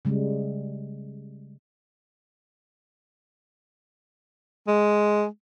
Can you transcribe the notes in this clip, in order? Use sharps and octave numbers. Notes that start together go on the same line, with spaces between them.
C#3 G3 G#3
G#3